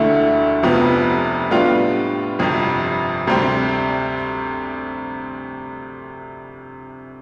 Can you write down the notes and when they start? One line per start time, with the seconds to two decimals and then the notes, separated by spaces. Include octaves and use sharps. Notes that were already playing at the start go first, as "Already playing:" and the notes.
Already playing: E1 D2 D3 A3 E4
0.63 F1 F2 C3 F3 B3
1.50 A2 G3 B3 D4 F4
2.39 G1 F2 C3
3.27 D2 C3 G3 C4